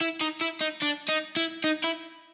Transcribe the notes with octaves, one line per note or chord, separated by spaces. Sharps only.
E4
D#4
E4
D#4
D4
D#4
E4
D#4
E4